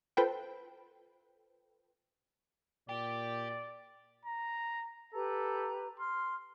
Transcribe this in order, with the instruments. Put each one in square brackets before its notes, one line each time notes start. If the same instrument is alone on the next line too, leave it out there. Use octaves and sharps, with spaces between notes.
[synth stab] F4 A4 B4 C5 G5
[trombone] A#2 [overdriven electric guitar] G4 [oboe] D5
[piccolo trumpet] A#5
[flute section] G4 B4 A#5 [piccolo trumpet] A4
[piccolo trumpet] C6 [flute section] F6